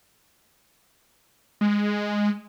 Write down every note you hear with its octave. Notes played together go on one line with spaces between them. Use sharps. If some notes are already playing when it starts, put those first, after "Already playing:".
G#3